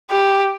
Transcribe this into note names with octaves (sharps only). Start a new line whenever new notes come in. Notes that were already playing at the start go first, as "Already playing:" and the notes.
G4